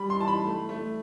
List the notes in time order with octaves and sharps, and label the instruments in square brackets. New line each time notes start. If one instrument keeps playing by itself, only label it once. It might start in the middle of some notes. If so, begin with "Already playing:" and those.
Already playing: [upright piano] G3 B5
C6
E3 A5
B5
A3
A3